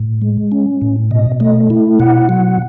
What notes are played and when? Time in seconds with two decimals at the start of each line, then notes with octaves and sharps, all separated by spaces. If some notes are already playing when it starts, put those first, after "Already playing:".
Already playing: A2
0.22 G#3
0.52 C#4
0.82 A2
1.11 B2 D#5
1.40 A3 D#5
1.70 E4
2.00 B2 F#5
2.29 F#3